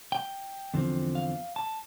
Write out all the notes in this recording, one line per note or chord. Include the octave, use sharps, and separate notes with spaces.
G5
E2 D3 F3 C4
F5
A5